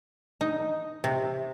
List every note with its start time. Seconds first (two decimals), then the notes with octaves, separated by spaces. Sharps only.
0.41 D#4
1.04 C3